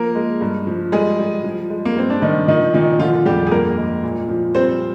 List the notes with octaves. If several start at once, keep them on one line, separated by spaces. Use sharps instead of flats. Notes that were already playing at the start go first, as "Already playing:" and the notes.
Already playing: F3 A#3 A#4
G#3
G2
F3
G3 G#3 G#4
G3
F3
G#3
A#3
G2 C4
D4
G2 D#3 D#4
D#3 F3 D#4
A#2 D#3 D#4
D3 F3 F4
F2 G3 G4
G#4
G2 A#3 A#4
G#3
A#2
F3
G3 C4 C5